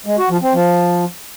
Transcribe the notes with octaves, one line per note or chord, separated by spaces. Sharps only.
G#3
F#4
F3
C4
F3